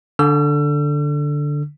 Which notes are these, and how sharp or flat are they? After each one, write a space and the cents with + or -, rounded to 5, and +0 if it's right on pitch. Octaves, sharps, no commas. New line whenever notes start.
D3 +0 E6 +40